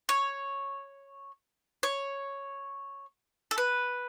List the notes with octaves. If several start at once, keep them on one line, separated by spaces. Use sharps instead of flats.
C#5
C#5
A4
B4